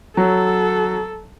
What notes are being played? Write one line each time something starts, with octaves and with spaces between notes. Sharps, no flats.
F#3 A4